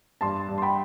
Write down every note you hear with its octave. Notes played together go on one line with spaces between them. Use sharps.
G2 A5 C6
G2
C6
G5 B5